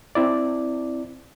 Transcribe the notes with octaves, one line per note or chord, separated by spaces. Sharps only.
C4 E4 D5